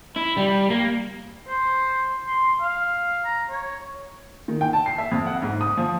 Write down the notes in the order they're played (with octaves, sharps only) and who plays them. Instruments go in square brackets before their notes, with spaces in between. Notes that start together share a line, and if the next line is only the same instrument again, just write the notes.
[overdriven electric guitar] E4
G3
A#3
[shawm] C5
C6
F5
A#5
C#5
[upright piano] D#3
G5
A5
C7
E5
F2
F#5
G#2
D#6
F3